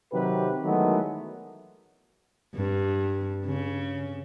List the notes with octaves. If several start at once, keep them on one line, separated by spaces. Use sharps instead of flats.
C3 D#3 F#3 G4 B4
D#3 E3 F#3 G#3 A3 B3
G2
C#3